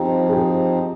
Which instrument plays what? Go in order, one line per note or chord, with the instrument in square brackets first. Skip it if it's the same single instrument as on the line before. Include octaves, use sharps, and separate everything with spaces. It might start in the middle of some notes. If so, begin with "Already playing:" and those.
Already playing: [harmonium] F3 C4 D#4 [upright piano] G4
[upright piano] G#4
G4